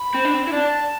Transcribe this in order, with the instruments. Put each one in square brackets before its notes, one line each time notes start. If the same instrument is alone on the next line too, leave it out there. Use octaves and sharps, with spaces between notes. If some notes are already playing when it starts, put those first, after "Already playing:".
Already playing: [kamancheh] B5
[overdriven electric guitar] C4
D4
C4
E4
[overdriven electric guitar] D4 [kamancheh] A5